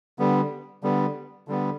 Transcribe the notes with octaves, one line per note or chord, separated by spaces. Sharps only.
D3 G3 B3
D3 G3 B3
D3 G3 B3